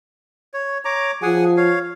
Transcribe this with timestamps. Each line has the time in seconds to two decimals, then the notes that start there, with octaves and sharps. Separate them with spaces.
0.54 C#5
0.85 C#5 A#5 D6
1.22 F3 G#4 F#5 G#5
1.57 C#5 F5